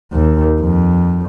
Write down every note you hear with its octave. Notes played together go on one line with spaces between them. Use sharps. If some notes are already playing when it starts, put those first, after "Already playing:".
D#2
F2